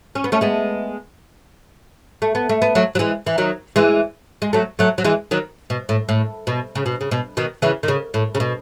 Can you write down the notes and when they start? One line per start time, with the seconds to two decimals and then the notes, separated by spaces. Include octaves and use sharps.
0.15 C#4
0.24 B3
0.32 A3 C#4
0.41 G#3 B3
2.22 A3
2.35 B3
2.49 A3
2.62 B3
2.75 F#3 A3
2.95 F#3
2.99 E3 G#3
3.27 E3
3.38 D#3 F#3
3.76 E3 G#3
4.42 G#3
4.53 F#3 A3
4.79 F#3 A3
4.98 F#3
5.04 E3 G#3
5.31 D#3 F#3
5.70 B2
5.89 A2
6.09 A2
6.47 B2
6.75 C#3
6.86 B2
7.01 C#3
7.11 B2
7.37 B2 D#3
7.62 C#3 E3
7.83 D#3
7.88 C#3
8.14 A2
8.35 C#3
8.40 B2